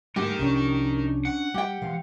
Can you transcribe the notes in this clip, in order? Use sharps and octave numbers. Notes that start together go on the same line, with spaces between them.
D2 G#2 G3 G#3 D#4 G4 A#4
C2 C3 F3 C#4 D4 C#5
F#5
G3 G4 G5
E3 F3 G#3 F5